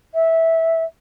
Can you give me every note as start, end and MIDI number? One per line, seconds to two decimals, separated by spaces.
0.14 0.84 76